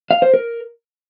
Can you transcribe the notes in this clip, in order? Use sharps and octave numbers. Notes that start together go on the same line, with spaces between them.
F5
C5
A#4